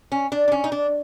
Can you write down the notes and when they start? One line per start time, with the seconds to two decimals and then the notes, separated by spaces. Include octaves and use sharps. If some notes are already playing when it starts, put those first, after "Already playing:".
0.12 C#4
0.32 D4
0.48 D4
0.52 C#4
0.64 D#4
0.72 D4